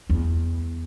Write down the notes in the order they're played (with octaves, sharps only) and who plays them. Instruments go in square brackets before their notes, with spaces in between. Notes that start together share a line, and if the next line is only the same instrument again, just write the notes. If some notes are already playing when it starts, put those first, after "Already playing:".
[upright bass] E2